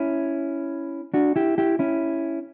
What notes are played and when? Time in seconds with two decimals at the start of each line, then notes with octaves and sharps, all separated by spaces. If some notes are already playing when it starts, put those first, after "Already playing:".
Already playing: C#4 E4
1.14 D4 F#4
1.36 E4 G4
1.58 E4 G4
1.79 C#4 E4